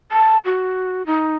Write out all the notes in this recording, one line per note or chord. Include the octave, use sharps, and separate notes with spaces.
A5
F#4
D#4